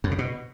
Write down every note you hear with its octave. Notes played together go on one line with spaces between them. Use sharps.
F#2
C#3
B2